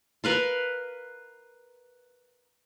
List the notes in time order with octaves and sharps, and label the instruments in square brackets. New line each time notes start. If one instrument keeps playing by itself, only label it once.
[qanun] A#4 B4 F5 C6